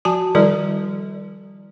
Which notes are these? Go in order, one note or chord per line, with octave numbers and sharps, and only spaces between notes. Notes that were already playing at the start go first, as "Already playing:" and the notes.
F3 F#4 G#5 A5
D#3 F3 G3 E4 A4 D5